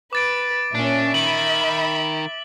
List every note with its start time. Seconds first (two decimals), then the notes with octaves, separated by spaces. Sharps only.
0.13 B4 D6 A6 D7
0.75 A#2 C#4 D4 E5
1.14 D#3 B5 F#7